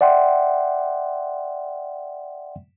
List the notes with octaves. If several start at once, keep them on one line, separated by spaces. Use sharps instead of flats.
D5 E5 F#5 G5 C6